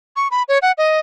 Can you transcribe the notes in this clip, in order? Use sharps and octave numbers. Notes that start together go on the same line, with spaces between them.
C#6
B5
C#5
F#5
D#5